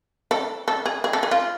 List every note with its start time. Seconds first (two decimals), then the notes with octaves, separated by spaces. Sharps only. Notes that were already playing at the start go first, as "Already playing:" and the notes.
0.31 A4
0.68 A4
0.85 G#4
1.04 G#4
1.13 A4
1.23 G#4
1.31 F4